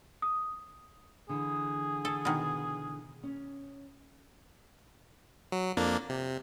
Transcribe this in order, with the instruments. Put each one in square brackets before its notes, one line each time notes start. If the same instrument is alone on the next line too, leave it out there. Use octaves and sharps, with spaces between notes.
[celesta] D#6
[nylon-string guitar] D3 E3 [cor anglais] G#4
[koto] A4
B2 D#3
[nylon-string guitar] C#4
[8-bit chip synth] F#3
F2 A#3 D4
C3